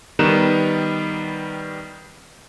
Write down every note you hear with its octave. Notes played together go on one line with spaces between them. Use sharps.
D#3 G3 B3 B4 A#5 E7